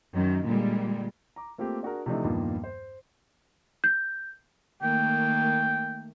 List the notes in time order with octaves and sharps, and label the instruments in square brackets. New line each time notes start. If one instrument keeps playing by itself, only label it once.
[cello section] F#2 D#3
A#2 D3 G3 G#3
[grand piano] A#5 D6
A3 A#3 C4 F4 G4
D4 F#4 G#4 A#4
C3 E3 F3 A3 D4 D#4
E2 G2 A#2 D#3 F3
C5
[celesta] G6
[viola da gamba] D#3 A3 A#3 [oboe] G5